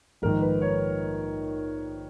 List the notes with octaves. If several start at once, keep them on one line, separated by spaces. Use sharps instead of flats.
A#1 G#2 D#3 A#4
B4
C#5